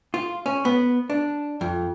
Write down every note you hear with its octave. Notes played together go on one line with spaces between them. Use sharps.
F4
C#4
B3
D4
F2